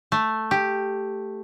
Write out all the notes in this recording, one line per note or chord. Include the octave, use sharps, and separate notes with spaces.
A3
G4